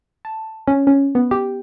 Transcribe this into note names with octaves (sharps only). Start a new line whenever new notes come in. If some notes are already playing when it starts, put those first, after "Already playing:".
A5
C#4
C#4
B3
G4